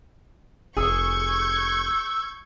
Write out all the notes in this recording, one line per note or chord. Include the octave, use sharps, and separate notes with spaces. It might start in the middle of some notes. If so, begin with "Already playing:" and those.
F1 G#4 C#6 E6 G6 G#6